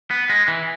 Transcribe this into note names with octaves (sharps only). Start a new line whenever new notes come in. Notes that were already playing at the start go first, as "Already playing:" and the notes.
B3
G#3
E3